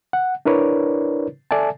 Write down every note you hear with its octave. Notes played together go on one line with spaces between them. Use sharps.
F#5
D4 E4 A#4 B4 C#5 D5
A4 D5 E5 G#5 A5